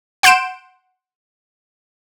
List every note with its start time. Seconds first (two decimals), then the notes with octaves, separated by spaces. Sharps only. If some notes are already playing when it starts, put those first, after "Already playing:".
0.23 F#5 C6 G6 D7 E7